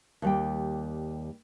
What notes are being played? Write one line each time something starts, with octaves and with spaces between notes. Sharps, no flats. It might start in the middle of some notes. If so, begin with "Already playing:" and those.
D#2 G3 G5